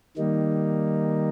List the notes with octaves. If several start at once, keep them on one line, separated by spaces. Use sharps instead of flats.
D#3 G3 A#3 D#4